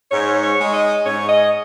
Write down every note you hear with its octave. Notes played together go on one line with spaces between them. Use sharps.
G#2 C#5
C#5
G#3 D#4
D#5
G#2 C#5
D#5